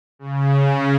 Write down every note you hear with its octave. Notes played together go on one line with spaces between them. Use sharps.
C#3